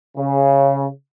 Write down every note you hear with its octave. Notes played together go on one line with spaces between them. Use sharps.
C#3